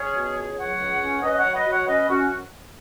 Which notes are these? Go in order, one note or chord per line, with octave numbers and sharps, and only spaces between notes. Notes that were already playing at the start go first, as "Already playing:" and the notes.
Already playing: C#4 G#4 C#5
B2
C#2
F#3 C#5 F#5
C#2
C#4
C#4 B4 D#5
D#5
C#5 F#5
F#3
B4 D#5
F#3
C#5 F#5
C#4 B4 D#5
F#2 C#4 F#4